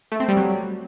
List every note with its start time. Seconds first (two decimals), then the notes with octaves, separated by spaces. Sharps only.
0.12 A3
0.20 C4
0.28 G3
0.37 F#3